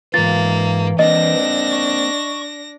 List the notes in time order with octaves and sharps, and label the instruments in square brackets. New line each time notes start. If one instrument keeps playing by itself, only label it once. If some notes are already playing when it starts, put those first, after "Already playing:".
[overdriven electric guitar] G#2 F4 [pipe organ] E3 [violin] A#3 [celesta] A6
[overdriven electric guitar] A#3 C4 [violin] D4 A#6 [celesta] D#5
[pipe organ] C#6